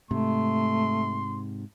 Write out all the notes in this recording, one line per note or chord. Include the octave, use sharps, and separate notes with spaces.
G#2 C3 A3 C6